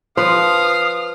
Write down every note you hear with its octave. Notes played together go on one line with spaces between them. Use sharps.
F3 B4 F5 D#6